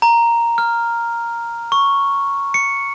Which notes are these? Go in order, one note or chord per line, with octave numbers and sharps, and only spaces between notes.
A#5
F6
C#6
C#7